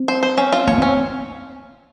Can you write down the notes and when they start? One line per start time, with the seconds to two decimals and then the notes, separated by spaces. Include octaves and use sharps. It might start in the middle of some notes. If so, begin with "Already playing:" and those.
Already playing: C4
0.08 C5
0.23 C5
0.38 C#4
0.52 F4
0.67 A#3 C#5
0.78 C4 C#4